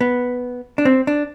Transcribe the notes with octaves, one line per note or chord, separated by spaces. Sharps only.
B3
D4
C4
D4